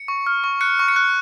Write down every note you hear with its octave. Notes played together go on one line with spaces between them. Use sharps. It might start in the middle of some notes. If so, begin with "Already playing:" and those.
Already playing: C#7
C#6
F6
C#6
F#6 C#7
C#6
C#7
F#6